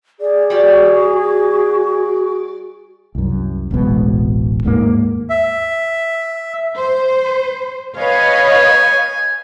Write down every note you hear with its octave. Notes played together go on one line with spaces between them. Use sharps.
G#4 D5
G3 F#4 D5
C2 F#2
D1 A1 B2 G#3
D#2 G#2 G3 A#3
E5
C5
B4 C#5 D#5 F5 G#5